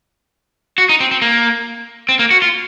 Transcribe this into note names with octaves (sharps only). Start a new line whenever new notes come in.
F#4
D#4
C4
C4
A#3
C4
A#3
F#4
F4